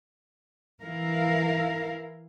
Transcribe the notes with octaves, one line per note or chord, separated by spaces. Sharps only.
E3 E4 A#4 F5